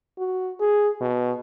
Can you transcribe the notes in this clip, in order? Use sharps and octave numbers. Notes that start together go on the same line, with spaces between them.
F#4
G#4
B2